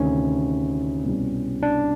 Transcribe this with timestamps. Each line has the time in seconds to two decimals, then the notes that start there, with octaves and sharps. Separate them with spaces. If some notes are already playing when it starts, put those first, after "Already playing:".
Already playing: D2 C3 D#3 C#4
1.04 C2 B2 G3
1.63 D4